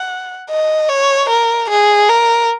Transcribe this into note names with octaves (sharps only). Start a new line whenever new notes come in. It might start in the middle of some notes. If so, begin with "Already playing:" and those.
Already playing: F#5
D#5
C#5
A#4
G#4
A#4